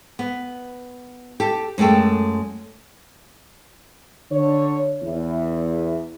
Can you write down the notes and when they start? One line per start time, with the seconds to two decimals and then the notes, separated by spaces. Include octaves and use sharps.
0.19 B3
1.40 G4 A4
1.78 F#2 G#3 A3 A4 G5
4.32 D3 C#5
5.02 E2 E4